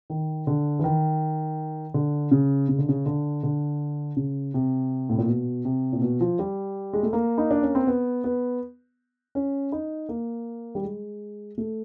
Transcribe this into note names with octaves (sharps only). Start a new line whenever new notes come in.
D#3
D3
E3
D#3
D3
C#3
C#3
D3
C#3
D3
D3
C#3
C3
A2
A#2
B2
C3
A#2
B2
F3
G3
G#3
A3
A#3
D#4
D4
C#4
C4
B3
B3
C#4
D#4
A#3
G3
G#3
A3